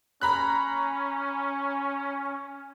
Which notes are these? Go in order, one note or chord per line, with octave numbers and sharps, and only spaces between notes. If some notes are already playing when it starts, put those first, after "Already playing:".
C#4 A#5 B5 F#6